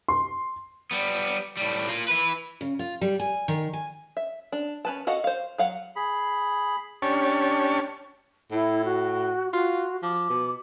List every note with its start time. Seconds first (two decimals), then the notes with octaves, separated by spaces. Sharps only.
0.08 C6
0.91 G3 B3
1.57 A2 G3
1.89 A#3 F4
2.08 E4 B4
2.61 C#3
2.79 F4
3.01 G3
3.20 G#5
3.48 D#3
3.73 G#5
4.17 E5
4.52 D4
4.85 C#4 B4 A5
5.07 F#4 A4 D#5 F5 F#5
5.24 C5 F5
5.58 F#3 F5 F#5
5.96 G#4 B5
7.02 C#4 D4 G4 C#5 A5 C#6
8.52 A2 E4
8.84 F#4
9.54 F4 F#4
10.03 F3 D6
10.30 B2